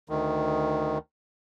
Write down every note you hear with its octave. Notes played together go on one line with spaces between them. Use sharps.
D2 D#3